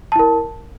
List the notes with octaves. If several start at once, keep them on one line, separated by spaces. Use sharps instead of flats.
E4 A#4 A5